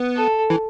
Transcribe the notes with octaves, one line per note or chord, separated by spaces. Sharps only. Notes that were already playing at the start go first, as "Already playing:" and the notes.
Already playing: B3
A4
E3